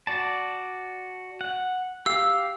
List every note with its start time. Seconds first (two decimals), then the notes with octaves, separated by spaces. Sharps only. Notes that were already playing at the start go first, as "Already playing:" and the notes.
0.07 F#4 D5 A5
1.41 F#5
2.06 G4 F5 E6